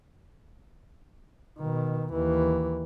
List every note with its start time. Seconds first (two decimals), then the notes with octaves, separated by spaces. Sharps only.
1.58 B2 D#3
2.12 D#2 E3